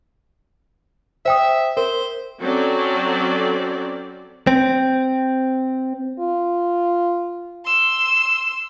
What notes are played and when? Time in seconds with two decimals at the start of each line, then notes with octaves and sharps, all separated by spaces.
1.25 C5 E5 G5 D#6
1.77 A#4 C5
2.39 F#3 C4 C#4 A4 D5
4.47 C4
6.20 F4
7.65 C6 E6